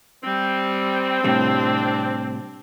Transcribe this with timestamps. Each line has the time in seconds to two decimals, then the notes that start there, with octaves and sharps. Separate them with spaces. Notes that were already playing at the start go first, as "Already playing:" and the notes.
0.24 G3 C4
1.24 A2 C3 G3 D4